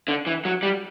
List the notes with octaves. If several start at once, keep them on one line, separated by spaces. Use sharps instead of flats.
D3
E3
F#3
G3